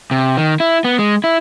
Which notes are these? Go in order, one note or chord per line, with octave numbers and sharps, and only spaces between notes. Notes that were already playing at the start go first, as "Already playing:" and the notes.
C3
D#3
E4
B3
G#3
E4